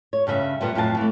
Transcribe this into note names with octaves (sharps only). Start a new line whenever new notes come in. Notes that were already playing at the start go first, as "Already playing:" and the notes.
C#5
G2 C#3 G4 E5
G2 A#2 E3 G3 B3
F2 A2 F#3 E4 G5 A5
E3 A3